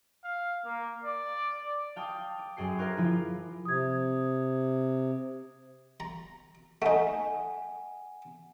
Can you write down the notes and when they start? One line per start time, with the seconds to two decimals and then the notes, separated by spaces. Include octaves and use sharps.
0.24 F5
0.65 A#3
1.04 D5
1.96 F5 G5 A5 D6 D#6 G6
2.39 D6
2.57 F#2 G#4 G5 C7
2.78 A#4 C5 F5 D6 F#6 G#6
2.97 F3 E4 F4
3.65 C3 D#6 G#6
6.00 A#5
6.82 A3 D#4 F#5 G#5